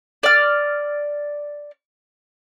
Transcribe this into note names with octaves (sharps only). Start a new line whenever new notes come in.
D5 F6